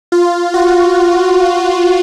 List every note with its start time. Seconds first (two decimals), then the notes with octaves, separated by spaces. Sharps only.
0.12 F4
0.54 F#4